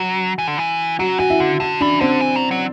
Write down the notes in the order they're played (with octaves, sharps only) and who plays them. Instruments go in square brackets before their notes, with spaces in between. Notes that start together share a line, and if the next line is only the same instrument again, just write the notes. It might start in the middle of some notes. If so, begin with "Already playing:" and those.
Already playing: [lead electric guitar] F#3 [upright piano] F#4
[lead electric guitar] E3
D3
E3
[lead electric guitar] F#3 [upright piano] F#4
[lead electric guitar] E3 [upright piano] F#4
[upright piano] E4
[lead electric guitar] D3 [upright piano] F#4
[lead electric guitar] D3 [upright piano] F#4
[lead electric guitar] E3 [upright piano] D4
[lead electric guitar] D3 [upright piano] C4
[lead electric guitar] E3
F#3
F#3